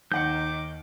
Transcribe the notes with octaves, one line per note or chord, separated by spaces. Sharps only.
D#2 D#3 F#5 C#6 D6 G6 C#7